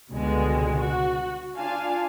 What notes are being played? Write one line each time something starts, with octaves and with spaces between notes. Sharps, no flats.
C#2 B2 D3 G3 G#3
F#4
D4 F4 F5 G#5 A5